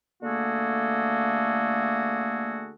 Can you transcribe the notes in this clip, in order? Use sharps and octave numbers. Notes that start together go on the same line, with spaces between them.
D3 A3 A#3 F#4 G#4 A4